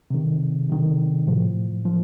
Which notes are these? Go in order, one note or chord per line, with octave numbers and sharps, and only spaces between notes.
C3 D#3
C3 D#3
A2 F3
F3